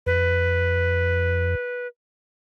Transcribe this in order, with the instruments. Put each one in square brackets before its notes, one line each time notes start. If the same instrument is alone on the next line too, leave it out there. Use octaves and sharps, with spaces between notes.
[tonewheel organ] F2 [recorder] B4